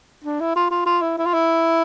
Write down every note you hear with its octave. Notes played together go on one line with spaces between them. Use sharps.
D4
E4
F4
F4
F4
E4
E4
F4
E4